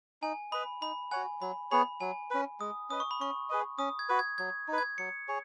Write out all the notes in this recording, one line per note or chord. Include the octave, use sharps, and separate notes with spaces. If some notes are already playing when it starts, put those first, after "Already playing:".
D#4 G#5
B4 D#5 B5
D#4 B5
F#4 C#5 F#5 G#5
F#3 B5
B3 G#4 C#5 B5
F#3 G#5
C#4 B4
G#3 D#6
C#4 B4 D#5 D#6
C#6
B5
C#4 C#6
G#4 B4 D#5
C#4 D#6
G#6
F#4 B4
G#6
F#3 G#6
D#4 B4
G#6
F#3 C#7
G#4 C#5